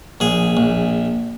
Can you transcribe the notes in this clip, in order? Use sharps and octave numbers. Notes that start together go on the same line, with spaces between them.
A#1 G#4
A#1